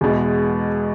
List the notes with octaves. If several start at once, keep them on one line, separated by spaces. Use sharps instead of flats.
E2 B2 G#3